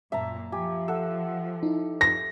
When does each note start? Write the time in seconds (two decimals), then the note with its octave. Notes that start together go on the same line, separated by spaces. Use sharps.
0.12 F#2 A#2 E5 A5 A#5
0.52 F3 G4 G#5
0.88 A4 F#5 E6
1.63 D#4 E4
2.01 A#6